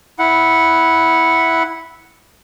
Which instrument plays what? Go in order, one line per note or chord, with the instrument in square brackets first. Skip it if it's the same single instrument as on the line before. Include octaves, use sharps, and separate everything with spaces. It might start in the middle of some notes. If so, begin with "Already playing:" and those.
[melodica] E4 F#5